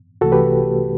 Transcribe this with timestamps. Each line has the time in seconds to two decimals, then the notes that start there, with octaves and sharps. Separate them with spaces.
0.21 C2 C3 E3 A3 F#4 A4
0.32 G4 B4